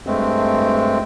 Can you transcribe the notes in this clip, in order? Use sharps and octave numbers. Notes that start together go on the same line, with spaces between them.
G2 G#3 A3 C4